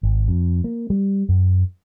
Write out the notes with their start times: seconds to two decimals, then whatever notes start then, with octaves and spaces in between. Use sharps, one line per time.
0.03 G#1
0.28 F2
0.64 A#3
0.90 G3
1.29 F#2